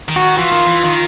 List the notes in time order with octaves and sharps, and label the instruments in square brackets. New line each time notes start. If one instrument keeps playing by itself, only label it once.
[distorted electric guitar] D#3
[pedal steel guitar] F#4
[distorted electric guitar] E3 [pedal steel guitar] F4
[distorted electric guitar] D#3
E3
D#3